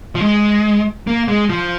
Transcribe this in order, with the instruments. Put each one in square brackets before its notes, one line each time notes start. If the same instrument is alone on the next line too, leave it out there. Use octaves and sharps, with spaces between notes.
[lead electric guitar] F3
G#3
A#3
G#3
F3